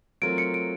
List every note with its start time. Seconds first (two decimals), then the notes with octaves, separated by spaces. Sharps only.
0.22 F#3 A3 C4 F4 A#4 D7
0.38 C#7
0.54 D7